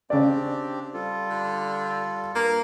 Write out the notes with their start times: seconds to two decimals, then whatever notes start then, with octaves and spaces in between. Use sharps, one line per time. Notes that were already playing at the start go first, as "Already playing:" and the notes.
0.10 C#3 C4 D4 G4 D5
0.94 G3 F4 A4
1.30 D3
2.35 G2 A#3